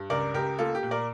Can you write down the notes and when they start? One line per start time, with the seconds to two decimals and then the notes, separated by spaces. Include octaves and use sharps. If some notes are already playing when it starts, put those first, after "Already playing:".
Already playing: G2
0.10 C#2 A#4 D5
0.34 C#2 G4 A#4
0.58 A#3 F4 A4
0.75 G4
0.83 A#2
0.91 A#4 D5